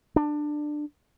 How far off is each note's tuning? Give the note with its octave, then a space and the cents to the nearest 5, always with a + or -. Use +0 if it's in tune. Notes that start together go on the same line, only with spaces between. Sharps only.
D4 +20